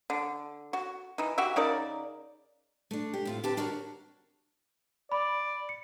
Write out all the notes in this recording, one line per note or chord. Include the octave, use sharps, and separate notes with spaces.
D3
F#4
E3 D#4
F#4 G4 E5
C#3 D#4 A#4 D5
A3 D4
G4
A2 C4 F4
D3 C4 G4 B4 A5
D4 F#4 A#4 C#5 A#5
D5 B5
C#7